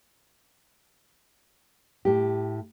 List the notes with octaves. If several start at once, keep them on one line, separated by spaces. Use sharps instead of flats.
A2 G4